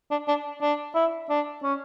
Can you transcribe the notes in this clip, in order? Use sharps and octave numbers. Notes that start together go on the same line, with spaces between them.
D4
D4
D4
E4
D4
C#4